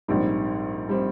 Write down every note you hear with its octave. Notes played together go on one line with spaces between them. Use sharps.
A#1 G#2 G3 C4
G3 C4